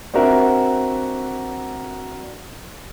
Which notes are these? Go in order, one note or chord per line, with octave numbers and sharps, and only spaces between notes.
C4 D4 F#4 A#4 E5 F#5